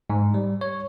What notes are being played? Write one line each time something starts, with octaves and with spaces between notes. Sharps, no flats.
G#2
G3
C#5